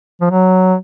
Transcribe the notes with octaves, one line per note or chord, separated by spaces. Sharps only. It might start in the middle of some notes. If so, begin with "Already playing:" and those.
F3
F#3